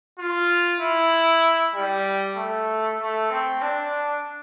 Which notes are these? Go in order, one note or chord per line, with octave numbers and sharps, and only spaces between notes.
F4
E4
G3
A3
A3
C4
D4